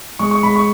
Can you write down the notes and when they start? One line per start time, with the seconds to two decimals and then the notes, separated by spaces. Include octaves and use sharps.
0.19 G#3 C#6
0.31 C#6
0.43 G#3 B5
0.56 C#6